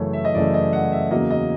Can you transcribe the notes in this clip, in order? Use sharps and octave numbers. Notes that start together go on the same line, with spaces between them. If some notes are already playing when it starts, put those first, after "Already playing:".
Already playing: F#2 C#3 E3 A3 C#5
E5
D#5
F#2 C#3 E3 A3 D5
D#5
F#5
E5
E2 C#3 F#3 A#3 D#5
D#5